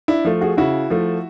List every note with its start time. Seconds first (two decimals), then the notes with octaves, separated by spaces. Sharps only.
0.08 D4 E4
0.25 F3 A3
0.41 F#4 G#4
0.57 C#3 E4 F#4
0.90 F3 A3